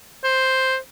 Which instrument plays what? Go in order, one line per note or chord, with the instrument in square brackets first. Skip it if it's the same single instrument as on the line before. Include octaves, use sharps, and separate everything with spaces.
[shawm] C5